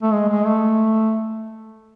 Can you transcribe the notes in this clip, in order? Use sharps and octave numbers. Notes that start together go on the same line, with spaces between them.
A3
G#3
G#3
A3